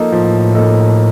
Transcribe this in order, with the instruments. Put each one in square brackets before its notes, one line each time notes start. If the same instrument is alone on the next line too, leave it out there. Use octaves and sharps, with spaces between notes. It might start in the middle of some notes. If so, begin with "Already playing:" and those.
Already playing: [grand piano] F3 A#3 D#4 A4
[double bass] A2 [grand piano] F3
[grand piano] A#3 D#4 A4